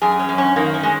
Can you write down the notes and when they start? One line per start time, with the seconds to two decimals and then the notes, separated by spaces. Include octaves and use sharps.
0.02 F#2 G#4
0.19 C#4
0.29 F#2
0.38 C#4
0.56 D#3 A#3
0.74 C#4
0.83 G#3